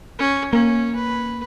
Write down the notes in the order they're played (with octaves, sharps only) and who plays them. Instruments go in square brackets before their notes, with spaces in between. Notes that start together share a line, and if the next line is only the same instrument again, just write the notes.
[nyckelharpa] C#4
[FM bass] A#3 [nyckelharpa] C#4
[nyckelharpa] B4